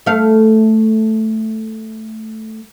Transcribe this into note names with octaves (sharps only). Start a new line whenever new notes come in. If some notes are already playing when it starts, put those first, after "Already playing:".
A3 F5